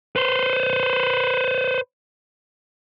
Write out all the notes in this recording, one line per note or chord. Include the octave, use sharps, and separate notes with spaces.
B4 C5